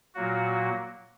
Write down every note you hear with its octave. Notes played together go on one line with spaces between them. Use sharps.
A#2 F#3 A#3 F#4